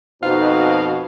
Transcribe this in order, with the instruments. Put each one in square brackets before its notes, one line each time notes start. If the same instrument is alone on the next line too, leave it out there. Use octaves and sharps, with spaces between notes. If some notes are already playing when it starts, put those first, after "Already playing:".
[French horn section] F2 B2 [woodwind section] D#4 F#4 C5 [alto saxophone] F5